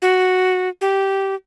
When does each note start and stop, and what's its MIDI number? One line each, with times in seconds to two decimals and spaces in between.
0.02 0.69 66
0.81 1.35 67